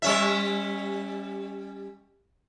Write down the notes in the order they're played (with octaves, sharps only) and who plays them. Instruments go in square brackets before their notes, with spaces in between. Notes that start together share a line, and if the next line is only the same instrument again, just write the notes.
[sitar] G3 C#4 E5